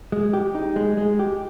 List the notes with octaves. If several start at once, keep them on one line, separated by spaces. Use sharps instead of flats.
G#3
G4
D#4
G#3
G#3
G4